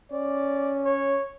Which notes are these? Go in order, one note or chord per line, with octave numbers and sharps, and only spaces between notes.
C#4 D5
C#5